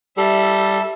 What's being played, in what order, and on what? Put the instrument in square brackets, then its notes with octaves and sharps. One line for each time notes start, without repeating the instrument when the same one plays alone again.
[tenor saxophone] G3 [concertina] A4 [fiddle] E5